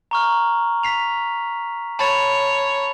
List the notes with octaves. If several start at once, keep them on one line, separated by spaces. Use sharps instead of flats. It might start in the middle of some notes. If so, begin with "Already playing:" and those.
A#5 C#6 F6
B6 C7 F7
C#5 A5 B5 A6